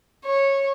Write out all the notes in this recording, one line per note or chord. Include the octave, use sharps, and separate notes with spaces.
C#5